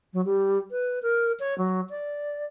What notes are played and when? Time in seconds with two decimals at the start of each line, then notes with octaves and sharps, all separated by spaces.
0.13 F#3
0.26 G3
0.71 B4
1.03 A#4
1.40 C#5
1.58 F#3
1.90 D5